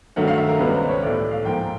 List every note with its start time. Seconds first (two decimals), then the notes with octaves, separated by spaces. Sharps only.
0.16 G2 D#3 F#3 A3 F#5
0.28 F5
0.38 E5
0.48 A#4
0.59 C#2 B2 G3 B3 B4
0.74 C5
0.89 C#5
1.02 A2 E3 A3 D5
1.31 F5
1.45 G#2 F3 A#3 G5